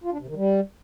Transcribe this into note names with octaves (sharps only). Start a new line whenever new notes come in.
F4
D4
C3
D#3
G3